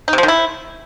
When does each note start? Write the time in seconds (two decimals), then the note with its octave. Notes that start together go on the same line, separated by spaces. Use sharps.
0.08 D#4
0.13 C3
0.18 F3
0.23 D#3
0.28 E4